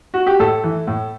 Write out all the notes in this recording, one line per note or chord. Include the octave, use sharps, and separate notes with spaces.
F#4
G4
A2 A4
E3
A2